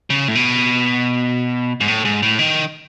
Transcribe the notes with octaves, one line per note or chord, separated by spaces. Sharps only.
C#3
A2
B2
G#2
A2
G#2
A2
D#3